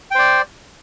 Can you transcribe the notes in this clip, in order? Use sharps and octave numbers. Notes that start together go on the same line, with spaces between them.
C5 D5 G5